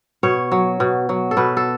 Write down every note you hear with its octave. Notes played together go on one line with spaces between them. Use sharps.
B2 C#5
F#3
B2
F#3
A4
B2 B4
A4